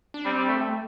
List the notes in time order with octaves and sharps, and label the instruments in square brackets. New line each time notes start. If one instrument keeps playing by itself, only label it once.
[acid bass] D4
[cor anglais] G3 [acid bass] C4
[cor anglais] G3
A3
[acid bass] A3